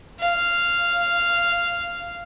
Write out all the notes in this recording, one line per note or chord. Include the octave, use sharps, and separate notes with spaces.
F5